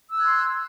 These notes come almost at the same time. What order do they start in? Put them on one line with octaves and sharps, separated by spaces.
E6 F#6 G#6 C6